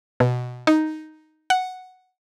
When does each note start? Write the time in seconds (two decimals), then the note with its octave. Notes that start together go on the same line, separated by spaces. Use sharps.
0.20 B2
0.67 D#4
1.50 F#5